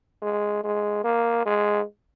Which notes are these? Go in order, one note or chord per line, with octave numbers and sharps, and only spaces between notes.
G#3
G#3
A#3
G#3